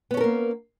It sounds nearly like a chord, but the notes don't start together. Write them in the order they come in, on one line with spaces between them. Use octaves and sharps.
B3 C#4 A4 A#4 A#3